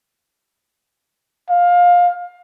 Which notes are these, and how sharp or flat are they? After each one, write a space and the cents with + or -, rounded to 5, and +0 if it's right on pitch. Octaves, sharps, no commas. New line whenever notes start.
F5 +20